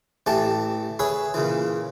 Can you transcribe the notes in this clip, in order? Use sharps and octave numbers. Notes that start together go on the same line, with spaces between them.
A1 E3 A3 G4 A5
G#4 B4 C#5 E5
A#2 C#3 E3